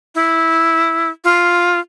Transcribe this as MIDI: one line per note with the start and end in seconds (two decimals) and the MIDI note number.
0.15 1.10 64
1.24 1.80 65